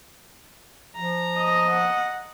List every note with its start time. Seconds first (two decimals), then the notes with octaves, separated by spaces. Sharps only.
0.96 F3 A#5
1.37 D#5
1.70 F#5